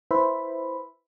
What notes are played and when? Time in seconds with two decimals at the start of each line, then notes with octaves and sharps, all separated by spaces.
0.11 E4 B4 C5 E5 B5